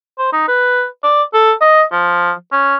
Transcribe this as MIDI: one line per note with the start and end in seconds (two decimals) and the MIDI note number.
0.19 0.31 72
0.33 0.45 63
0.48 0.85 71
1.04 1.23 74
1.34 1.52 69
1.61 1.83 75
1.92 2.32 53
2.52 2.76 61